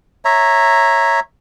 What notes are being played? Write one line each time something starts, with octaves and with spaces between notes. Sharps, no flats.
C#5 E5 A#5